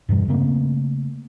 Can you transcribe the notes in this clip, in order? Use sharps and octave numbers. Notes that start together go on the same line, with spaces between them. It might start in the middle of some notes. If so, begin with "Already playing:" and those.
E2 G2 B2 G3
C#3 A3 A#3 C4